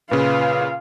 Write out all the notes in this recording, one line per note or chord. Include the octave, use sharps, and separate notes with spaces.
A#2 C#3 F4 B4 F5